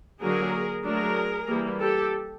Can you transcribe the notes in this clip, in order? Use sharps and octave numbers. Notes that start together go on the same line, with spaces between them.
D3 F#3 A#3 G#4 A#4
F#3 A3 D4 G#4 A#4
E3 G3 A#3
G4 A4